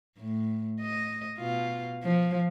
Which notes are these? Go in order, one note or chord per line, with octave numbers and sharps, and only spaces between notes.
A2
D#5
B2 F4
F3